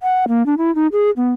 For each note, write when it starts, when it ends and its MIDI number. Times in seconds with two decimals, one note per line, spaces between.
0.03 0.25 78
0.28 0.45 58
0.46 0.55 62
0.58 0.74 64
0.75 0.87 63
0.92 1.10 68
1.17 1.32 59